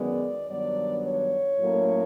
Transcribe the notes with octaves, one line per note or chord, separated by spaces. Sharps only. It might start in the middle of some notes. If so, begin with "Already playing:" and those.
Already playing: F#2 D#3 G#3 B3 D5
G2 D#3 F#3 B3 D4 D5
C#5
A2 F#3 A#3 C#4